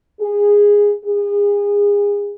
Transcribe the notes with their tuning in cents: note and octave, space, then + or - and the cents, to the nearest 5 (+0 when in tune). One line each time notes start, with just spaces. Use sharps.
G#4 -15
G#4 -30